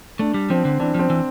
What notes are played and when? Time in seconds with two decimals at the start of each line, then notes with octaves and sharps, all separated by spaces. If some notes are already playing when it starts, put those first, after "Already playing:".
0.19 A3 D4
0.34 G3
0.50 F3 C4
0.65 D3
0.80 E3 D4
0.95 F3 C4
1.10 E3